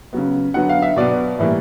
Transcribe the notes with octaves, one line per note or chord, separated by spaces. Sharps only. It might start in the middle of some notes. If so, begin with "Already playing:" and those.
C#3 F#3 B3
D3 F#3 B3 F#5
F5
E5
B2 F#3 B3 D5
A2 E3 G3 A#3